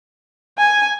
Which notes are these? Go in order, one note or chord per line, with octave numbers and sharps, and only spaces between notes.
G#5